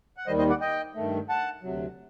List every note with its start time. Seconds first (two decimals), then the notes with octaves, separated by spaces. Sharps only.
0.17 F#5
0.27 D#2 D#3 G3 C5 D#5
0.38 C5 D#5
0.49 D5 F#5
0.61 D#5 G5
0.95 G2 D#3 A3
1.29 F#5 A5
1.63 D2 C3 F#3